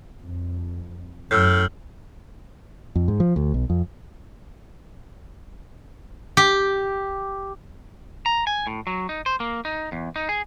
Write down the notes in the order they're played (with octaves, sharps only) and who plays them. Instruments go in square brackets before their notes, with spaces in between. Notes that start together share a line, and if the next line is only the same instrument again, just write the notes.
[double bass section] F2
[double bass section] F#2 [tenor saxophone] A2 [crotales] E6 F6 G6
[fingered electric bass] F2
G#2
F3
D2
B1
F2
[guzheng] G4
[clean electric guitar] A#5
G#5
A2
F#3
D#4
C5
A#3
D#4
E2
D#4
G#4